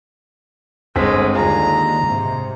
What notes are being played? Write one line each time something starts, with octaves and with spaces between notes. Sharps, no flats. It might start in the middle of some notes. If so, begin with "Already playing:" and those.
G1 G#3 C4 B6
D#2 D3 F4 G#4 A#5
G#2 C3